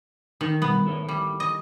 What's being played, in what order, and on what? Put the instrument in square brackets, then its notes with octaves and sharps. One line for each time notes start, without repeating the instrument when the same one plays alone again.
[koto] D#3
[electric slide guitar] B2 G3 [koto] B3
[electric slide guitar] E4 A4 C#5
[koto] G3
D#5